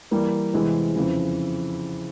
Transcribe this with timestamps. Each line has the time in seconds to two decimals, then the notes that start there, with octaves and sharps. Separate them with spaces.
0.11 E3 G3 A#3
0.54 E2 C3 E3 G#3 C4
0.96 F2 C#3 E3